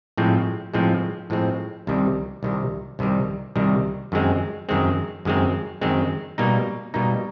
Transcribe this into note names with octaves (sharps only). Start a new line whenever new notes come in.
A2 F3 G#3 C4
A2 F3 G#3 C4
A2 F3 G#3 C4
C2 C3 D#3 G3
C2 C3 D#3 G3
C2 C3 D#3 G3
C2 C3 D#3 G3
F#2 D#3 G#3 C4
F#2 D#3 G#3 C4
F#2 D#3 G#3 C4
F#2 D#3 G#3 C4
B2 G3 A#3 D#4
B2 G3 A#3 D#4